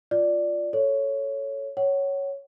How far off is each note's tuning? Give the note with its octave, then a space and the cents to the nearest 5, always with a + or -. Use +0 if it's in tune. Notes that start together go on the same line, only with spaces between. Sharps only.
F4 +0 D5 +0
A4 +0 C#5 +0
C#5 +0 F#5 +25